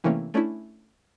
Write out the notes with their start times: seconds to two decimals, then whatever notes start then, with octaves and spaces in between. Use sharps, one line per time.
0.04 C3 E3 A3 A#3 C4 C#4
0.34 A3 C#4 D4 E4